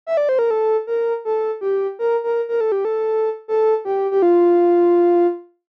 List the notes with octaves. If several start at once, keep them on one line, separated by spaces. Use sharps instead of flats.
E5
D5
C5
A#4
A4
A#4
A4
G4
A#4
A#4
A#4
A4
G4
A4
A4
G4
G4
F4